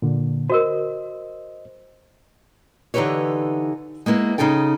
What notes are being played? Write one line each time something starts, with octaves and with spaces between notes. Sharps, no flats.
A#2 D3
F#4 A#4 C5 D#5
D3 E3 D#4 G4 B4 C#5
G#3 A#3 B3 E4
C#3 D#4 G#4 A4 G5